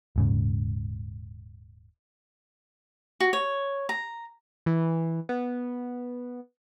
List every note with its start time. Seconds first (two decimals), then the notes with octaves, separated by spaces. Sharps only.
0.16 D#1 G#2 C#3
3.20 F#4
3.33 C#5
3.89 A#5
4.66 E3
5.29 B3